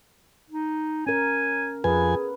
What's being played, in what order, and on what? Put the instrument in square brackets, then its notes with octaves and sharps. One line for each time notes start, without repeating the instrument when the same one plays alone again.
[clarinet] D#4
[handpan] C#4 A#4 [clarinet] G#5
[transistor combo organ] F2 G#5 [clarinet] G#4 [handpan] B4